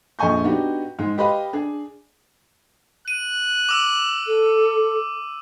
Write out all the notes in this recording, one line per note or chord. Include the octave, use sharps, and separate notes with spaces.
A#1 F2 D#5 G#5 C#6 G6
B3 D4 D#4 F#4 G4
G#2 G#3
G4 B4 D#5 F5 B5
D4 G#4
F#6 D#7
D6 E6
A4